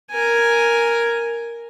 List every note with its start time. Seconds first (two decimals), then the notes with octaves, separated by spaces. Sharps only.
0.11 A#4 G#5